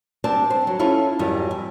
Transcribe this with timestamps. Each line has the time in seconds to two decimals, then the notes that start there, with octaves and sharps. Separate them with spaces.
0.24 G3 C4 D4 A5
0.50 C5
0.67 F#3
0.79 C#4 E4 F4 A4
1.19 F2 G#2 D#3 F#3 G3
1.51 E4